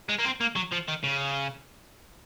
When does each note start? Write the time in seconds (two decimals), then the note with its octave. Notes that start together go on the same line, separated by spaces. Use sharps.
0.09 G#3
0.19 A#3
0.25 C4
0.41 A#3
0.56 F#3
0.72 F3
0.89 D#3
1.04 C#3